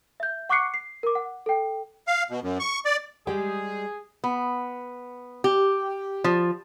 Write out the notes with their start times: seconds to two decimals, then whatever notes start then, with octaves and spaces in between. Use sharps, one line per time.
0.20 E5 G6
0.49 F#5 C#6 D6 F#6 C7 C#7
0.74 C7
1.03 A#4 D6
1.15 F#5
1.46 A4 G5
2.07 F5
2.30 B2
2.43 F#2
2.60 C#6
2.85 D5
3.27 G3 G#3 G4 G#4
4.24 B3
5.44 G4
6.24 F3